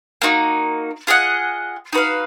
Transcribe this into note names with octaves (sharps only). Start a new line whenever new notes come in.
A#3 D#4 F#4
F4 G#4 D#5 F#5
D#4 F#4 B4 F5